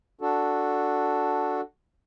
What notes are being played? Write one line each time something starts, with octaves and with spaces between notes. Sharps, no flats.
D4 F#4 A4